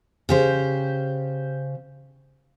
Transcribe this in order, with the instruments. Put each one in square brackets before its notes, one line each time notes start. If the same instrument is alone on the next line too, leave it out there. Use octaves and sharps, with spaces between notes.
[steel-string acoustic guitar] C#3 G4 C5